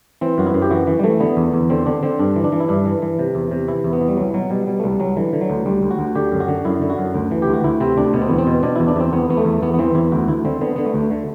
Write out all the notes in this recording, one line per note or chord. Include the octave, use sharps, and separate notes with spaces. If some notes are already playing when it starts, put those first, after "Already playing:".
E3 C4
F#2 F#4
E4
F#2
G4
E3 F#4
E3
G3
E3 A3
D3 B3
E2
E2
D3 C4
D3 D4
D3 C4
G2 D4
E3
D4
E3
E4
G2 D4
E3
E3
C3
E2
C3
E3 E4
E2
B3
E3
G3
C2 F#3
B2 F#3
B2 G3
B2 G3
A3
C2 G3
C2 F#3
D3 E3
D3
F#3
D2
D2 G3
D2
F#4
D2
D3 G4
F#2
F#4
D3
F#2 E4
D3
F#4
F#2
D2
E3
G4
D2
F#4
D2 E4
C3 C4
D2 D4
B2 B3
C4
E2 B3
C4
B2
B2 D4
E2 E4
D4
E2 C4
E2 B3
E2 B3
A3
E2
E2 B3
B3
E3 C4
E2 E4
D2 F#4
D2 E4
D3 C4
D3 B3
D3 B3
A3
D2
D3